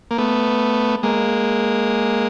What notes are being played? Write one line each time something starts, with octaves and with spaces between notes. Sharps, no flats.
A#3
A3 B3
G#3 A#3